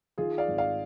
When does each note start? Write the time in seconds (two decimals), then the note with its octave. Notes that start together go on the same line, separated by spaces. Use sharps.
0.18 D#3 F4 G#4
0.38 D5 F5
0.48 G#1
0.58 D5 F5